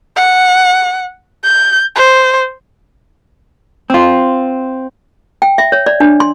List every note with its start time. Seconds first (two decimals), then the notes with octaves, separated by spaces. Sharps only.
0.16 F#5
1.44 G6
1.95 C5
3.90 C4 F4
5.42 G5
5.58 E5
5.72 C#5
5.86 D5
6.00 D4
6.20 C6